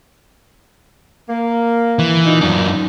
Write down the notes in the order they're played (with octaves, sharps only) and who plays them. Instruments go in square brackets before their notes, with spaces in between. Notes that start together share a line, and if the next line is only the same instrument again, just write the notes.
[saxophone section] A#3
[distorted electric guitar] E3
[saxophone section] A#2 D#4
[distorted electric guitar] F#2 D4